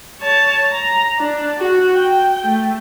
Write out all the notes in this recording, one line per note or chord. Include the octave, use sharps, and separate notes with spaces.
C#5 A5
A#5
D4
F#4
G5
A3